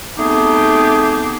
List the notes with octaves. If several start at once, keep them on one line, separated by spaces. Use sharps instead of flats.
A3 B3 C4 D#4 G4 G#4